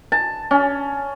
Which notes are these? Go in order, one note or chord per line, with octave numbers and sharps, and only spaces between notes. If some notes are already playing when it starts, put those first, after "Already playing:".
A5
C#4